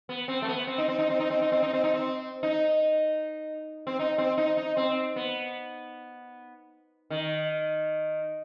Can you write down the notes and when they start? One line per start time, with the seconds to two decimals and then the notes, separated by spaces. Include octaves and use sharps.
0.09 B3
0.28 C4
0.42 A3
0.48 B3
0.67 C4
0.78 D#4
0.88 C4
0.99 D#4
1.10 C4
1.20 D#4
1.30 C4
1.42 D#4
1.52 C4
1.63 D#4
1.73 C4
1.84 D#4
1.94 C4
2.43 D#4
3.87 C4
3.99 D#4
4.18 C4
4.37 D#4
4.57 D#4
4.77 C4
5.16 B3
7.10 D#3